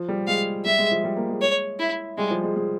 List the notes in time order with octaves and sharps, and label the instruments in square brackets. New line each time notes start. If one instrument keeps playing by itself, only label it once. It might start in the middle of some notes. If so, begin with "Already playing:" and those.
Already playing: [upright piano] F3
G3
[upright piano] G#3 [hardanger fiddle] F5
[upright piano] G3 [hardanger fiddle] E5
[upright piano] G#3
F3
G3
A#3
G#3
[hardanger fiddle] C#5
E4
[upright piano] G3 [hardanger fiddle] G#3
[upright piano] F3
G#3
G#3